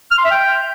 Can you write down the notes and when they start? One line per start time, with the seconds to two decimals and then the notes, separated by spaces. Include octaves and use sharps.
0.11 F6
0.18 C6
0.24 E5
0.31 G5